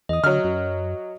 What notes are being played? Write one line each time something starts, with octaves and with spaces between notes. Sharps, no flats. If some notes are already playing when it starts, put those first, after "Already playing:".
E2 D#5 D#6
D3 F#3 F6
F#2